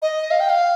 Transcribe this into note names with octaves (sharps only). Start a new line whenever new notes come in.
D#5
F5
G5
F5